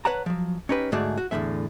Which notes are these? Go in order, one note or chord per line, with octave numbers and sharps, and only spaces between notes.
B4 C#5 F#5 A5 A#5
F3 F#3
C#4 D#4 G4 B4
G#2 D3 A3 F#4 G#4 D5
F#4
E2 A2 D3 G#3 E5